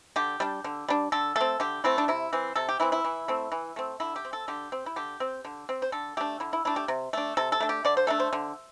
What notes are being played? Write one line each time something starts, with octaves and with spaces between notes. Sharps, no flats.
D3 G4
G3 D4
D3
G3 D4
D3 A4
A3 C4 A4
D3 G4
A3 C4 E4
D4
C3 E4
E3 C4
C3 A4
G4
E3 C4 E4
E4
E3
A3 C4
E3
A3 C4
D3 E4
G4
C4
A4
D3 G4
C4
E4
D3 G4
C4
D3
C4
C5
D3 A4
A3 D4 G4
D3 E4
E4
A3 D4 E4
G4
C3
A3 D4
C3 A4
A4
A3 D4
G4
D3 D5
C5
A3 D4 A4
C5
D3